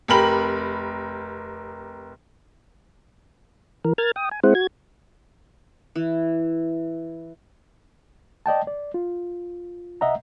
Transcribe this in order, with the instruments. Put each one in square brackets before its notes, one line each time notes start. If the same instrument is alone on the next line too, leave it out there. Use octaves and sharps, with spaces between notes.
[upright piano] F1 G4 A#4 B5 F#7
[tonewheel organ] E3 A#4
A#4 F6 G#6 A6
G5 D#6
G#5
G#3 C4 E4 G#4 C5 F#5
F#4 G#6
[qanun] E3
[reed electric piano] D5 D#5 G5 A5
D5
F4
C2 D#5 E5 F#5 A#5